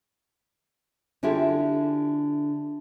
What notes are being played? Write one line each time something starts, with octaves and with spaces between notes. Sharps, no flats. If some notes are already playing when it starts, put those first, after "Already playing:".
D3 E4 F4 G4 G#4